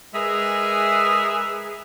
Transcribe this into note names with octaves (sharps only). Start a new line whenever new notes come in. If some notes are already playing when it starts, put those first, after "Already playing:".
G#3 G#4 A#4 B4 E5